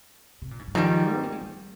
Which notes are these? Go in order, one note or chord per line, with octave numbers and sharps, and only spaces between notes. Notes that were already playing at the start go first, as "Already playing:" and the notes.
C3
A#2
G#2
G2
G#2 D#3 F3 G3
C4
A#3
G#3
G3